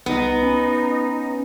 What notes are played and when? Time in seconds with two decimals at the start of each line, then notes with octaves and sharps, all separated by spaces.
0.06 C2 B3 D#4
0.43 C#4